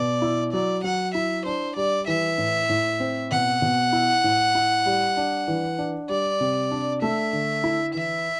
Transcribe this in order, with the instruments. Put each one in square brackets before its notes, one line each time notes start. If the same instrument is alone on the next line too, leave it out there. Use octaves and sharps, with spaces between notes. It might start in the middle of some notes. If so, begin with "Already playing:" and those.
Already playing: [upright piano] B2 [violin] D5
[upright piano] E4
[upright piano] F#3 [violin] D5
[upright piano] F#3 [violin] F#5
[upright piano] E4 [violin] E5
[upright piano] D4 [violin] C5
[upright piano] G3 [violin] D5
[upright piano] E3 [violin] E5
[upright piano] A2
A2
C4
[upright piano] B2 [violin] F#5
[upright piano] B2
E4
A2
E4
G3
D4
E3
D4
[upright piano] G3 [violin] D5
[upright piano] C3
D4
[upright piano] A3 [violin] E5
[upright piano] D3
E4
[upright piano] E3 [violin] E5